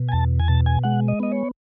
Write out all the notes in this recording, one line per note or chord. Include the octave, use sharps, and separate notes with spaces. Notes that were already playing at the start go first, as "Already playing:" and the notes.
Already playing: B2
G#5
E2 A5
G#5
B2 A5
G#5
G#3 F#5
D#5
B3 D#5
C#5